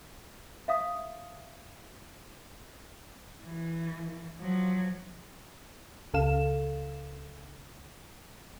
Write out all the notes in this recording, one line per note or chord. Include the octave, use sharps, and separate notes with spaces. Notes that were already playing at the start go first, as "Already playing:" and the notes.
E5 F5 D#6
E3
F3 F#3
C#2 C#3 A4 F5 E7